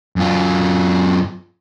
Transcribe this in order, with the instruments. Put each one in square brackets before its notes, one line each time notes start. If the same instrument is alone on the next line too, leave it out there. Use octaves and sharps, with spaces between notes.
[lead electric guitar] F#2 F4